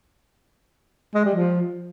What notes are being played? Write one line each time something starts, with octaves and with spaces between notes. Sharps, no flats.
G#3
G3
F3